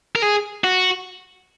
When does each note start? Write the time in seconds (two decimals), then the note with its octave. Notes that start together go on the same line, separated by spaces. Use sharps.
0.16 A#4
0.22 G#4
0.64 F#4